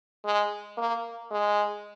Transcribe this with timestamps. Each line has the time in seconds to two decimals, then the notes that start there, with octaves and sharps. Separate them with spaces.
0.25 G#3
0.77 A#3
1.31 G#3